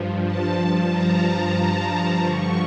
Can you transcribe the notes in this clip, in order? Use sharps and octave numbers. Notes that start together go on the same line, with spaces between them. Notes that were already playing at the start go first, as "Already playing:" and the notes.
Already playing: G2 F3
A5
A#5
G2 D3 F3 C#6